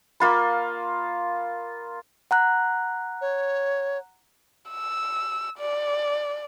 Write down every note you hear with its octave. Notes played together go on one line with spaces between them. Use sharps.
A#3 F4 B5
F#5 A#5 F#6
C#5
E6
D5